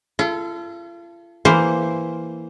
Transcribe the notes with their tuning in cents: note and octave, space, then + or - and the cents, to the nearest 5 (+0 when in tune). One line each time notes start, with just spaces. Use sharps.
F4 -40 A4 +0
E3 +0 A#3 +0 C5 +0